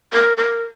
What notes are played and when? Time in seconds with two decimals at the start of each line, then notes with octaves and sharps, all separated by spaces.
0.13 A#4
0.37 A#4